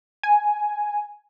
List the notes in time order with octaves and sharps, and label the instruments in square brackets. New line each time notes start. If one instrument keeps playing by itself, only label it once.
[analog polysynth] G#5